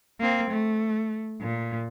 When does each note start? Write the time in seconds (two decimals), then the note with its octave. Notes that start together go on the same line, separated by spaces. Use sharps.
0.20 A#3 C4
0.50 A3
1.41 A#2